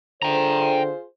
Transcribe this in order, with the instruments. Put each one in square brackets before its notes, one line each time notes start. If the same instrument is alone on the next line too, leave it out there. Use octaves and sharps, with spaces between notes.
[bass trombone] D3 [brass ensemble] F4 G#4 C5 [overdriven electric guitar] G5 A#5